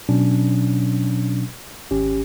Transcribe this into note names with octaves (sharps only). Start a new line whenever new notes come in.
B2 F#3 C#4 D4
G#1 C#4 G4